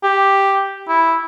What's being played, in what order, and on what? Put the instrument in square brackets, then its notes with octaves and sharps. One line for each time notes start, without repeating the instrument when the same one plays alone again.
[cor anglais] G4
E4